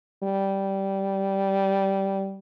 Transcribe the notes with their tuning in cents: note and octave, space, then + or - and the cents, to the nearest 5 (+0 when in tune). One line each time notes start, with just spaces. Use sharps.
G3 -10